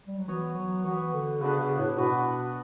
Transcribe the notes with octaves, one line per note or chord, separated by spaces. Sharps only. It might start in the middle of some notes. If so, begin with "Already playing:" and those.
G3
F#3
E3 B3 F#4 C#5
F#3
E3 B3 F#4 C#5
D3
C#3 B3 D4 F#4 B4
C#3
A2
B2 B3 D4 F#4 B4